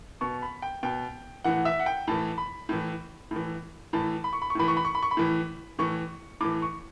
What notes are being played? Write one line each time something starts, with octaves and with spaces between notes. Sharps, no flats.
B2 C#6
B5
G5
B2 G5
A2 E3 F#5
E5
F#5
G5
A2 E3 A5
B5
A2 E3
A2
E3
A2 E3 A5
B5
C#6
B5
C#6
A2 E3 B5
C#6
B5
C#6
B5
C#6
B5
A2 E3
A2 E3 C#6
A2 E3 D6
C#6